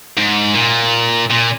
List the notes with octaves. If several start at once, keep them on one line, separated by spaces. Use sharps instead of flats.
G#2
A#2
A#2